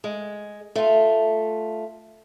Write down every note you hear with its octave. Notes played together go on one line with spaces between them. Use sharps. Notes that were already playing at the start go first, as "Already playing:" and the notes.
G#3
A3 F4